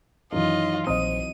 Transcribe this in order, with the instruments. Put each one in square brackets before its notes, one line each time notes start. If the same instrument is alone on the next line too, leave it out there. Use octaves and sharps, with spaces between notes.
[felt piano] F#2 D#3 [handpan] E3 F#3 D#4 [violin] F4 D#5
[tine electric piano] A#1 C5 [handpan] C4 D#5 [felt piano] D#6 [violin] D#7